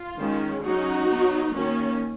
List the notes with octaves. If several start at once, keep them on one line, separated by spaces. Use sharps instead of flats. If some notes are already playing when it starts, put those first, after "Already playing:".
Already playing: F4
D#3 G#3 C#4
F#3 C#4 D#4 F#4
F#3 B3
D#3 A#3 C#4